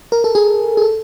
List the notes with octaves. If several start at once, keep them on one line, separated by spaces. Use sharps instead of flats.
A#4
A4
G#4
G#4
A4